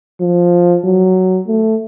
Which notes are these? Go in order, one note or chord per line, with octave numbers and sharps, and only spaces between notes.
F3
F#3
A3